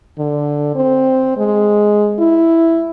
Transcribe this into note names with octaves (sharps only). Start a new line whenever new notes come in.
D3
C4
G#3
E4